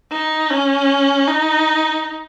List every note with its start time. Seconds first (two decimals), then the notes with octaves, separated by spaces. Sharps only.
0.12 D#4
0.51 C#4
1.28 D#4